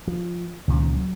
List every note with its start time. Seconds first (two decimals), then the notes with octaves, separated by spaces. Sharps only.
0.08 F3
0.68 C#2 A#2 D#3 C#4
0.95 F#3